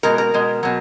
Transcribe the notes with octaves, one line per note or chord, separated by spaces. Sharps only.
B2 G#3 A#4
A#4
B2 G#3
B2 F#3